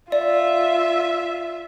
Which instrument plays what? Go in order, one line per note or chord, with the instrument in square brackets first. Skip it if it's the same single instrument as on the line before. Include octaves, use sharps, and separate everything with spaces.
[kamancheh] F4 E5 [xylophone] D5